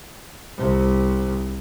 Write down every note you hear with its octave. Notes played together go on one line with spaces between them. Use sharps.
C2 C3